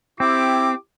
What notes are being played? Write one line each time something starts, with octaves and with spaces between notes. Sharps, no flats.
C4 E4 G4 D6